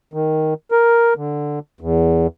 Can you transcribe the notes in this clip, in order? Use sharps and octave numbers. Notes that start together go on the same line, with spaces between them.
D#3
A#4
D3
E2